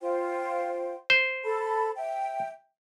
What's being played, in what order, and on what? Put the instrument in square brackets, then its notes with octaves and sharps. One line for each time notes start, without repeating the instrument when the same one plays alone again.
[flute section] F4 C5 G5
[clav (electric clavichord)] C5
[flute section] A4 A5 B5
E5 G5